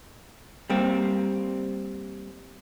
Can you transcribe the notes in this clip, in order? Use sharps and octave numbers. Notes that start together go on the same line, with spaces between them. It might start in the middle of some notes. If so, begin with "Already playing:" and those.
G3 A#3 C4